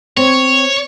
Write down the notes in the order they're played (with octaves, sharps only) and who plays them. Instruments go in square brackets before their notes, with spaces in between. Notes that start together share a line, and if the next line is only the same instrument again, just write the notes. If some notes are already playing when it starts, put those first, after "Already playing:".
[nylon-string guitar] C4 [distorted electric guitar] C#5